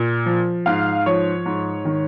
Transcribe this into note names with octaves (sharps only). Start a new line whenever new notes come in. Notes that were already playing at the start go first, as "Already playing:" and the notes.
Already playing: A#2
F3
G#2 F5
F3 C#5
G#2
D#3